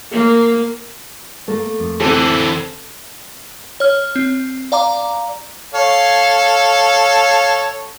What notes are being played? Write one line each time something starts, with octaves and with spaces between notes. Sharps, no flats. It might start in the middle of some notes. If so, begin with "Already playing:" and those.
A#3
A3 A#3
F2
D3 E3 C4 A4
C#5 F6
C4
D5 F5 A#5 D6
A4 C#5 F5